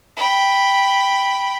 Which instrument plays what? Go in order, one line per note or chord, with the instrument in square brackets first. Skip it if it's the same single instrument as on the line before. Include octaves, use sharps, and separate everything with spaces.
[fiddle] G5 B5